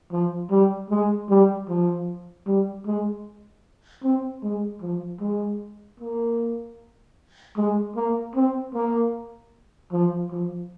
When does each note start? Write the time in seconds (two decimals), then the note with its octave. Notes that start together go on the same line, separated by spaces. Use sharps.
0.12 F3
0.50 G3
0.90 G#3
1.29 G3
1.68 F3
2.46 G3
2.86 G#3
4.04 C4
4.43 G#3
4.82 F3
5.21 G#3
5.99 A#3
7.57 G#3
7.96 A#3
8.35 C4
8.74 A#3
9.92 F3
10.31 F3